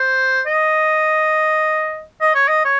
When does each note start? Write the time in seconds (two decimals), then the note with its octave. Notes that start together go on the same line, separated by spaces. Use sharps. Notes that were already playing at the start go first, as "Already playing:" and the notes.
Already playing: C5
0.46 D#5
2.21 D#5
2.35 C#5
2.48 D#5
2.65 C#5